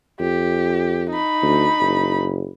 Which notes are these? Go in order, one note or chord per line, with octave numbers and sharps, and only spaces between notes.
F2 G4
D#4 B5
D2
F#1